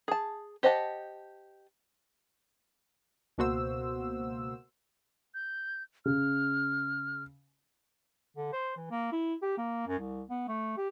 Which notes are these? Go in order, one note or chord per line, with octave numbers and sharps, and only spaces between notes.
G#4 A5
G4 C5 D#5 F#5 A5
C#2 B2 A#3 F#4 C5 E6
G6
C#3 F6
D3
C5
E3
A#3
E4
G4
A#3
F#2
C2
B3
A3
G4